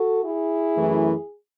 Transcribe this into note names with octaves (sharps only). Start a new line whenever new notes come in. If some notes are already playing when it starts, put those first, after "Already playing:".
Already playing: F#4 A4
E4 G#4
F#2 E3 A3